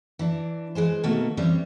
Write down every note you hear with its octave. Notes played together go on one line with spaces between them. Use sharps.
E3 D4
E3 G#3 G#4 C5
B2 D#3 A3 A#3 F#4
E3 G3 C4 C#4 C5